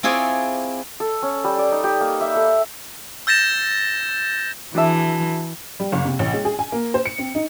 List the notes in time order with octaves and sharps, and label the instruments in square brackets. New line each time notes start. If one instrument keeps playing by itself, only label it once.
[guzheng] C4 E4 F4 G#4 C#5 D5
[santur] A4
C#4
G3
D5
D#4
G4
A#3
E5
A4
[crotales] E6 G6 A6 A#6 E7
[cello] E3 [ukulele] D4 G#4 E5 [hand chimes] F#4 A5
[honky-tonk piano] G3
F#1
C3
A1
G#3
G#4
G#5
A#3
C5
C#7
C4
D#4